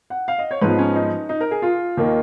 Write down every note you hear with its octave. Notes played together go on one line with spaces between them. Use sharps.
F#5
F5
D#5
C#5
G#2 F3 B3 B4
C#4
D#4
D#4
A#4
G#4
F4
D#2 D#3 A#3